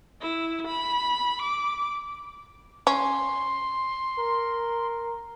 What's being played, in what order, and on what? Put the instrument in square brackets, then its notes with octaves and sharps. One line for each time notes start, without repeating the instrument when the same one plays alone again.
[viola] E4
B5
D6
[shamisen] C#4 [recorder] C6
[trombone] A#4